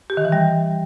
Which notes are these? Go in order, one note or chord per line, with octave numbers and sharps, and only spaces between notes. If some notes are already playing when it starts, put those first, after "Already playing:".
G4
D#3
E3
G3